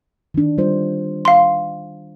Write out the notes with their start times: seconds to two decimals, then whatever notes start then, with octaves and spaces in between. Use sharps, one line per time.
0.34 D#3 D4
0.58 G3 F4 C5
1.25 F5 C6